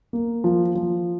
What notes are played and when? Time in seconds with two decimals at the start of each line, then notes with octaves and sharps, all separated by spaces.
0.13 A#3
0.44 F3
0.75 F3